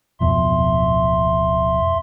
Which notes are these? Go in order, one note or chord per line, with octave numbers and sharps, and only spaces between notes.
D1 F2 B2 E5 C6